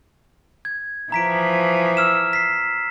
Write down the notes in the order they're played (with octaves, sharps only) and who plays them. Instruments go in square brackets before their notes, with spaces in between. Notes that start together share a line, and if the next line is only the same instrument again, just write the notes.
[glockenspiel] G#6
[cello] E3 F3 [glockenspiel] A#5 B6 D7
[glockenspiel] E6 F6 E7
B6 C7